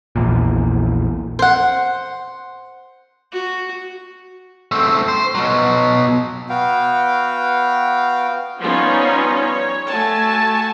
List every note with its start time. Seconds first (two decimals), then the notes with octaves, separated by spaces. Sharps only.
0.16 A#1 E2 A#2
1.39 C5 F#5
3.32 F#4
4.72 A3 C4
5.08 C5
5.35 B2 F#3
6.49 B3 F#4 F5 G5
8.58 F3 G3 B3 C#4 D#4 F4
9.41 C#5
9.88 A3 F#4 G#5 A5